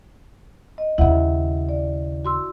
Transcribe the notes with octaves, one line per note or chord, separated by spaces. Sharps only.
D#5
D#2 C#3 E4 E5 F#5
D5
F#4 C6 E6